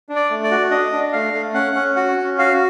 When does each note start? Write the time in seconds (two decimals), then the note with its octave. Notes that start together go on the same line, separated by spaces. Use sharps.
0.09 D4
0.16 D5
0.30 A3
0.44 D5
0.51 F#4
0.71 D4 D#5
0.92 D4
1.13 A3 F5
1.33 A3
1.54 C#4 F#5
1.75 C#4
1.96 F#4 F#5
2.17 C#4
2.39 F#4 F5